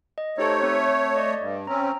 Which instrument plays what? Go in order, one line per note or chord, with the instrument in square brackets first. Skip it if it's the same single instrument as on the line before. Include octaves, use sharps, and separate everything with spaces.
[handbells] D#5
[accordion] A3 C#5 [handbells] D#4 G4 C5
[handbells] C4 A4
D5 D#5
[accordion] G2
[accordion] C4 C#4 [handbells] A#5